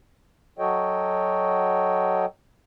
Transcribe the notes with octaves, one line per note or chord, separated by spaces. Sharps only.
F#3 F#4 A4 C#5 D#5 G5